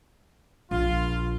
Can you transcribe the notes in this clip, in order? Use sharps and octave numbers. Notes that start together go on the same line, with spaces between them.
A#1 F4